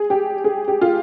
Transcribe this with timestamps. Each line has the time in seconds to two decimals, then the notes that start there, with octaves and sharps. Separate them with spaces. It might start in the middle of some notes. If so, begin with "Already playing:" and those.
Already playing: G#4
0.10 G4
0.44 G#4
0.68 G4
0.81 F4